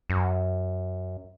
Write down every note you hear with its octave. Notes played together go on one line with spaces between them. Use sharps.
F#2